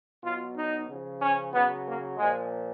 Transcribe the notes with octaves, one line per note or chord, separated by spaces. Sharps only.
B2 F#3 F4
D#4
C#3 F3
C#4
C#3 F#3 B3
A#3
A#2 F3 G#3